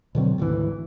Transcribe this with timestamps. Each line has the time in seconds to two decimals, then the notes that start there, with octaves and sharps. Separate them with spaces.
0.15 B2 D3 F#3 C4
0.38 G#1 D2 D#3 E3